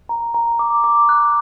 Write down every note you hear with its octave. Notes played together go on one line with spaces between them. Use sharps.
A#5
A#5
D6
D6
F#6